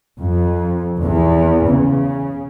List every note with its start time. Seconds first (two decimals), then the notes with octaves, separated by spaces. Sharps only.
0.20 F2
1.00 E2
1.68 C#3